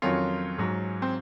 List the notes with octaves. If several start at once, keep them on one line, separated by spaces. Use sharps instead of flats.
F2 D#3 F#3 C#4 F4
G#2 F#3
C4